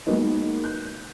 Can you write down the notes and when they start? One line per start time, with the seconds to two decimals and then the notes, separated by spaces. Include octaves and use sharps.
0.06 F#3 G#3 A#3 B3 D#4
0.64 F#6 G6